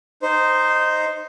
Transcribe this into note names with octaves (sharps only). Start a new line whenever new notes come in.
D#4 C5